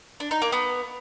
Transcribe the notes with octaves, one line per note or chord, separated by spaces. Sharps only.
D4
D#4
A#3
B3